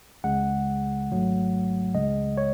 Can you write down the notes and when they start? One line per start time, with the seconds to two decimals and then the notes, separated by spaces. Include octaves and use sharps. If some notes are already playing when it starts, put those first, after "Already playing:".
0.24 C#2 C#3 G#3 F#5
1.10 G#1 G#2 F#3 A3
1.94 C#2 C#3 G#3 D#5
2.38 C#5